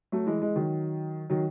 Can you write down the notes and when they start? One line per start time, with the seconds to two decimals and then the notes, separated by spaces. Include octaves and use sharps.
0.12 F#3 A3
0.26 E3 G#3
0.42 E3 G#3
0.56 D#3 F#3
1.30 D#3 F#3